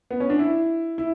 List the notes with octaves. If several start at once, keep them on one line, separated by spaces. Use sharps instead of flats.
B3
C#4
D4
E4
E4